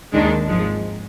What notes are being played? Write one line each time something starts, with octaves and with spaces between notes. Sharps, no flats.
D#2 D#3 G#3 D4
G#1 G#2 F3 G#3